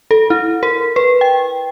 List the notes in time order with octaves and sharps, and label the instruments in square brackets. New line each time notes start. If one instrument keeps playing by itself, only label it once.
[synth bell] A4
E4
A#4
B4
G5